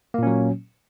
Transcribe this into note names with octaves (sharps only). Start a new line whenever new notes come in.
A#2 F#3 A#3 C#4